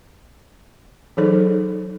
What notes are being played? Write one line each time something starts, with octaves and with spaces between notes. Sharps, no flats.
E3 F#3 D#4 G#4 A4 C5